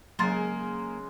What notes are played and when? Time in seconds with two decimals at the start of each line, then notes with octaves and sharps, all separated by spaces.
0.19 C#3 F#3 G#3 A#3 A#4 C6 A6